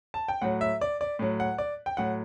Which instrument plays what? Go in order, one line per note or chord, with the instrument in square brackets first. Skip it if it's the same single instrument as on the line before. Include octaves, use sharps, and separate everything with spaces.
[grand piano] A5
G5
A2 F#3 F#5
E5
D5
D5
A2 F#3
F#5
D5
G5
A2 F#3 F#5